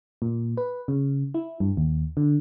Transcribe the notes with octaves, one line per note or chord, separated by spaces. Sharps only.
A#2
B4
C#3
E4
G2
D#2
D3